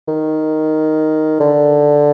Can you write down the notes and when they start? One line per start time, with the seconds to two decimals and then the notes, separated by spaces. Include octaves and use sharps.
0.08 D#3
1.40 D3